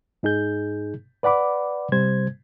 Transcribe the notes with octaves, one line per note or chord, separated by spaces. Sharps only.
G#2 D#4 G#4 G6
B4 D5 F#5 B5 D6
C3 G3 C5 G#6